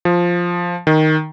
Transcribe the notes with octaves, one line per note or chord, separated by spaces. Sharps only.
F3
D#3